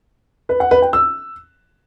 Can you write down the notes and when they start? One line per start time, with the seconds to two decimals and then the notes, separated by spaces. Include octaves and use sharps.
0.49 B4
0.60 F#5
0.71 B4
0.82 G5
0.93 E6